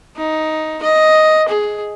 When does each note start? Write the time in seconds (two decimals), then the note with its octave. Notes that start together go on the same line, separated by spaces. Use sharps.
0.17 D#4
0.82 D#5
1.48 G#4